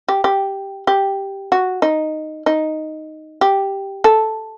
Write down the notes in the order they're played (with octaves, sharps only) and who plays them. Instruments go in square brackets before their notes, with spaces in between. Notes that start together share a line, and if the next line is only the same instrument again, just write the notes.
[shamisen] G4
G4
G4
F#4
D#4
D#4
G4
A4